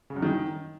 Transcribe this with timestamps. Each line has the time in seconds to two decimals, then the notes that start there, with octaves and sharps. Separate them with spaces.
0.10 C#3
0.16 F#2
0.22 D#3